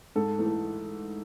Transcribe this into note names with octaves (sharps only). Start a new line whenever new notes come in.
G#2 A4
E3 A3
A4